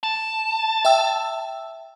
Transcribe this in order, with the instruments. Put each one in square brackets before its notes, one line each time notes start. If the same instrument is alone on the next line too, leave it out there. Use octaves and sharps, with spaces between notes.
[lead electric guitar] A5
[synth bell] E5 G5 E6